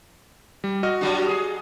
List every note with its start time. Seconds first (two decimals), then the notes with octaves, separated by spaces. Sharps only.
0.64 G3
0.83 F#4 D#5 F6
1.01 F#3 G3 D4
1.29 G#4